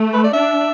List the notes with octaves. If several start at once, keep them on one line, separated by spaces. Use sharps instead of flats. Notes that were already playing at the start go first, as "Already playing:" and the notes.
Already playing: A3
B4
D5
D4 E5